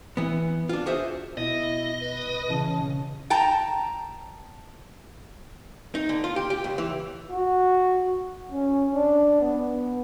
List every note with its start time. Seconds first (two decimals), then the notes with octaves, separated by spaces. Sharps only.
0.17 E3 B3
0.69 D4 F4
0.86 F#4 G#4 C5 E5
1.37 B2 E4 D#5
2.01 B4
2.50 C#3 E3 A5
3.30 G5 A5 A#5
5.95 D#4
6.09 D3
6.24 F4
6.36 G4
6.50 G4
6.64 C#2
6.78 E3
7.31 F#4
8.52 C#4
8.95 D4
9.41 B3